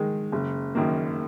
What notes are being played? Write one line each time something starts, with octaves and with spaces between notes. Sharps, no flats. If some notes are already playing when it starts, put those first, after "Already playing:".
Already playing: D#3 G#3
F#1
F#2 D#3 A#3